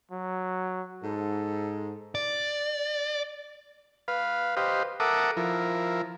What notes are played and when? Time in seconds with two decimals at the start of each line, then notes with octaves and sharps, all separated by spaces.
0.11 F#3
1.03 G#2 A4
2.15 D5
4.08 B4 F5
4.57 G4 B4 C5 D#5 F5
5.00 A4 A#4 E5 F#5 D6 D#6
5.37 F3 E4 A#4